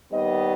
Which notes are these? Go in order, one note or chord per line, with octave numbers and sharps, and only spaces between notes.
D#2 D#3 G3 B3 D#5